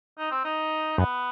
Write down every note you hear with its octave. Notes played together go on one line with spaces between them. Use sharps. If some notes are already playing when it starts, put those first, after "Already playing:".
D#4
C4
D#4
F#2 B3